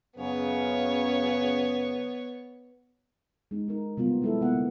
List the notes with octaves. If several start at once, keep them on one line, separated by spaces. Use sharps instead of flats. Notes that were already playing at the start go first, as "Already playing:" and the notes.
F#2 C#3 B3 C#5
G#3 D#4
D#4 A#4
C3 F#3 G3 B3 F4
G#3 E4 A4
C3 A#3 B3 F#5
D3